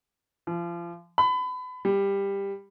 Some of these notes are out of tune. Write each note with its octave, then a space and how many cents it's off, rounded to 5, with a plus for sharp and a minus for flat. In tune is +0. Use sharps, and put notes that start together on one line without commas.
F3 -30
B5 +30
G3 +15